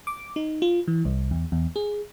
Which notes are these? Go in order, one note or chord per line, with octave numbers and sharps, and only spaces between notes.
D6
D#4
F4
E3
C2
E2
E2
G#4